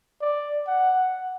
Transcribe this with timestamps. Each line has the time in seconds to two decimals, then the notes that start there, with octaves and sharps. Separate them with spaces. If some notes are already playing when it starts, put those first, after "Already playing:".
0.21 D5
0.68 F#5